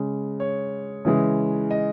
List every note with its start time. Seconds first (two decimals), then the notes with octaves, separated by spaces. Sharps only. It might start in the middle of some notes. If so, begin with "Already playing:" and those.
Already playing: C#3 G#3
0.40 C#5
1.05 C#3 E3 G#3
1.71 D#5